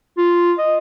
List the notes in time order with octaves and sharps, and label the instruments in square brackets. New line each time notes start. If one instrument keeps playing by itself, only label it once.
[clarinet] F4
D#5